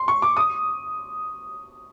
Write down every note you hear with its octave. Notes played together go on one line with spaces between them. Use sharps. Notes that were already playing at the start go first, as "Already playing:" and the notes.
Already playing: C6
C#6
D6
D#6